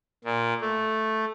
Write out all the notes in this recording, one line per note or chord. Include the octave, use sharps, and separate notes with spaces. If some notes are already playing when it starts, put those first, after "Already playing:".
A#2
A3